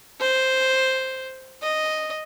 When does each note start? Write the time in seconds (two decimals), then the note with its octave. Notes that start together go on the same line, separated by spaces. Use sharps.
0.20 C5
1.62 D#5